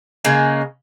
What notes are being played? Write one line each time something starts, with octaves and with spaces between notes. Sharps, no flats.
C#3 G#3 A#3